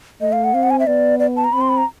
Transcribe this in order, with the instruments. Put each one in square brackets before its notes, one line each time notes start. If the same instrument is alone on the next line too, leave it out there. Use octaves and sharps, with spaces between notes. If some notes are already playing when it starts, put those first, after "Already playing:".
[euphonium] A3 [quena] D#5
[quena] F5
F#5
[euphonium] C4 [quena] F5
[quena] F#5
G#5
E5
[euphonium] B3 [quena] D5
[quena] D5
A5
A#5
[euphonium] C4 [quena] B5
[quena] C6
B5
A#5